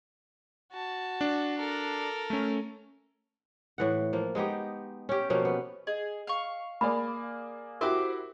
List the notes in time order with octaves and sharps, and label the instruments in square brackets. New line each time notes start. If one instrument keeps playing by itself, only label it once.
[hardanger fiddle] F#4 A5
[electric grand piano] D4
[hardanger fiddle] A4 A#4
[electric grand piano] A3 C#4
[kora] A2 E3 F#5
F3 A#3
G#3 B3 D#4 G4
C#4 G4
B2 F3 A#3 C#4
B3
[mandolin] G#4 [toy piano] D#5
[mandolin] F5 C#6
[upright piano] A#3 G#4 D5 [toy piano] B5
[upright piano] E4 F#4 G4 [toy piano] A#4 [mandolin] C5 D6